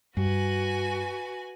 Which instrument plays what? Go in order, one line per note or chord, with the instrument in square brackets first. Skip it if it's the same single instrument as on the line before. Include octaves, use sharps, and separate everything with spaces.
[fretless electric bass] G2 [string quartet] F#4 B4 G#5